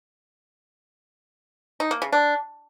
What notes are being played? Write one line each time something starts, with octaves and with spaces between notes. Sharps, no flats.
D#4
A#3
C#3
D4